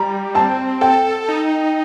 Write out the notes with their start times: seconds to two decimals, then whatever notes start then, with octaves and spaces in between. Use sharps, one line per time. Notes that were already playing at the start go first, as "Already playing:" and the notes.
Already playing: G3 A#5
0.34 C4 A5
0.81 A4 G5
1.28 D#4